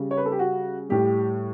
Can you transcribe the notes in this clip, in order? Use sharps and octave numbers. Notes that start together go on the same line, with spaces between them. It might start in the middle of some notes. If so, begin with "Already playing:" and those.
Already playing: C#3 G3
C#5
B4
A4
G4
F#4
A2 G3 G4